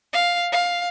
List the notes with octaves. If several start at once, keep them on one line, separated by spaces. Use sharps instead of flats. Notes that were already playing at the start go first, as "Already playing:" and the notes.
F5
F5